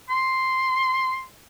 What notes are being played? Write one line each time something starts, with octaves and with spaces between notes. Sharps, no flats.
C6